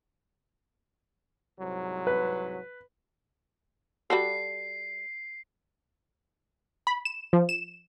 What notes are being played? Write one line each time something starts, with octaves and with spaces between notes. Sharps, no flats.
C2 G#2 F#3
B4
G3 F#4 A4 C7
B5
E7
F3
E7